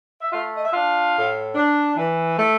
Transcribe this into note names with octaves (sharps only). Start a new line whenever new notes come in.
E5
A3 F4 F5
D#5
E5
D4 F4 F5
A2
D4
E3
A3